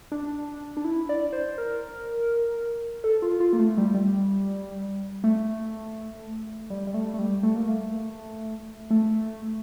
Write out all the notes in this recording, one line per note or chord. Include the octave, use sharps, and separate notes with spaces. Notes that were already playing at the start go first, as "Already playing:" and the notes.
D4
D4
E4
D5
C5
A#4
A4
F4
F4
A#3
A3
G3
G3
A3
G3
G3
A3
A3
G3
A3
A#3
A3
A3